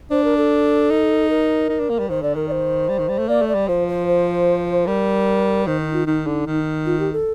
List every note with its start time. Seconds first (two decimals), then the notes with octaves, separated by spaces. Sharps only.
0.11 D4 C5
0.24 A#4
0.37 A4
0.90 D#4
1.30 A#4
1.69 D#4
1.79 D4
1.89 A#3
1.99 G3
2.09 D#3 C5
2.22 D3 D5
2.35 D#3 A#4
2.48 D5
2.52 C5
2.88 G3
2.99 D#3
3.08 G3
3.18 A3
3.28 A#3 D5
3.41 A3
3.48 D5
3.55 G3
3.68 F3 C5
3.88 C5
4.08 C5
4.87 G3 A#4
5.66 D#3 C5
5.80 D#4
5.93 F4
6.06 D#3 D#4
6.27 D3
6.46 D#3
6.86 F4
6.99 G4
7.13 A4